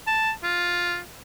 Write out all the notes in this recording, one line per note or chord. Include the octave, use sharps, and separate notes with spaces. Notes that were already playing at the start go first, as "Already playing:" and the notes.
A5
F4